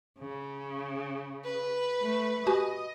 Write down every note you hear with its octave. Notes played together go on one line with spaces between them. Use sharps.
C#3
B4
A3
F#4 G4 D#5 G#5